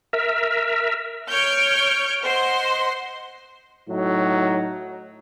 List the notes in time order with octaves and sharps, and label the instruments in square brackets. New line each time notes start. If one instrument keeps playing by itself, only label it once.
[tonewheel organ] A#4 E5
[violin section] C#5 F6 G6 D7
C5 D#5 F#5 C6
[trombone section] A2 F#3 D#4